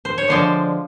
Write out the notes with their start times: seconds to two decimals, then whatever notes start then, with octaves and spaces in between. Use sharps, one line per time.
0.05 C5
0.18 C#5
0.28 D3 F3 G#3 C5 D5